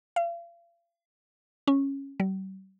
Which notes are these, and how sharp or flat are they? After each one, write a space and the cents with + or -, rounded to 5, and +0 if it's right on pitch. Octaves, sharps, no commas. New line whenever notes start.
F5 -40
C#4 -10
G3 -45